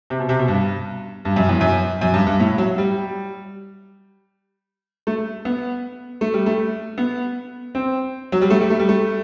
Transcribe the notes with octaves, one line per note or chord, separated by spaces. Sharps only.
C3
B2
C3
B2
G2
G2
F#2
E2
F#2
F#2
G2
G2
A2
F#3
G3
A3
B3
A3
G3
A3
B3
C4
F#3
G3
A3
G3
A3
G3
A3